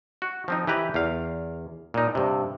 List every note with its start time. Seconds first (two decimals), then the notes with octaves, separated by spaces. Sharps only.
0.22 F#4
0.48 F3 C4 D#4
0.67 E3 G4 B4 A#5
0.94 E2 F5
1.94 A#2 D#4
2.15 G2 C3